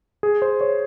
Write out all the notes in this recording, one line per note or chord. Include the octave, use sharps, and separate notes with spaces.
G#4
C5
C#5